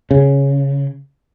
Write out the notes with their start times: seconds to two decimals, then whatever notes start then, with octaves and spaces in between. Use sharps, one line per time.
0.11 C#3